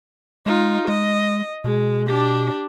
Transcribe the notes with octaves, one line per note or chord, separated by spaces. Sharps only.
G#3 D#4 F4
G#3 D#5
B2 G#3
D4 G4